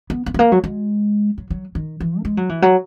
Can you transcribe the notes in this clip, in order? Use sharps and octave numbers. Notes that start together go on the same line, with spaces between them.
B3
B3
G#3
A#3
F#3
G#3
F#3
F#3
D#3
E3
A#3
G#3
F#3
E3
F#3